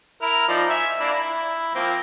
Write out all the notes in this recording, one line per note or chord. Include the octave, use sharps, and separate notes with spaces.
E4 A#4 F6
F3 D#4 D5
E5 G#5
A#3 D4 E4
E4
F3 A#3 C4